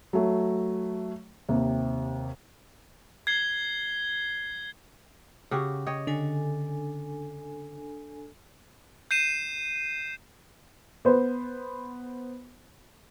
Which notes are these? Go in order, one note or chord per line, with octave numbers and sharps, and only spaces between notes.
F#3 A3
D#2 C3
G#6 C7 G7
C#3 F#4 G4
C#5 D#5 G5
D3 D4 A4 G#5
G6 C7 D#7 E7
B3 C5